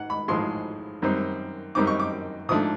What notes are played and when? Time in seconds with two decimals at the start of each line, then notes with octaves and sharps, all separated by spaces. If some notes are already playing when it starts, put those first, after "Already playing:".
Already playing: G#2 F#5
0.10 B5
0.28 A1 G#2 F3 G#3 C6
1.02 F#2 D#3 G3 C4 D#4
1.75 F#2 D#3 G3 C4 D#4 D6
1.87 C#6
2.00 D6
2.49 G#2 F3 A3 D4 D#6